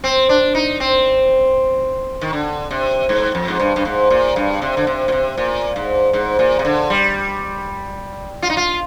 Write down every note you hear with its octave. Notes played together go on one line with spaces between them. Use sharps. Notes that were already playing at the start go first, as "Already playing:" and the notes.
C4
D4
D#4
C4
D#3
D3
C3
G#2
F2
G#2
G2
G2
G#2
A#2
G2
C3
D3
C3
A#2
C3
A#2
G#2
G#2
A#2
C3
D3
G3
F4
D#4
F4